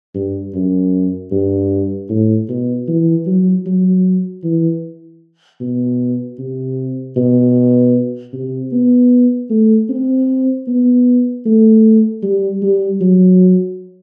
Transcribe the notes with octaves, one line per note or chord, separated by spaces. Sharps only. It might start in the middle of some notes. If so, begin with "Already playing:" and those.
G2
F#2
G2
A2
B2
E3
F#3
F#3
E3
B2
C3
B2
C3
B3
A3
C4
B3
A3
G3
G3
F#3